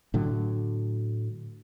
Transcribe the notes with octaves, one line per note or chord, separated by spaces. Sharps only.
A2 D3 F#3